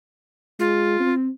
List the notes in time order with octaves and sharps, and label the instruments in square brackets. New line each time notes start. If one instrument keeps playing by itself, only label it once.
[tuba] G#3 [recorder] F4
[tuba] C4